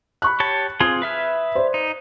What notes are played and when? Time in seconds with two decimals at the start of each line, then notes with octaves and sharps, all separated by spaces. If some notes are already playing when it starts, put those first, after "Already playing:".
0.22 B5 C#6 F#6
0.40 G4 C#5 A5
0.80 C4 F4 G#4 D#6 G#6
1.02 B4 E5 F6
1.55 C5 D5
1.74 D#4